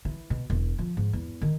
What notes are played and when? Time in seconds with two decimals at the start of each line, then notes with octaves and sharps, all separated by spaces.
0.05 E3
0.30 B2
0.50 E1
0.79 F3
0.97 G#2
1.13 E2
1.42 D#3